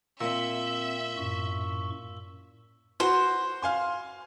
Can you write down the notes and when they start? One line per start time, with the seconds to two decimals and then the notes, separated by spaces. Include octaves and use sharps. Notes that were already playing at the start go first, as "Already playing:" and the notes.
0.21 A#2 C4 E5 E6
1.17 F#2 A2 C#6
3.00 F#4 B4 C5
3.62 F5 G#5 C6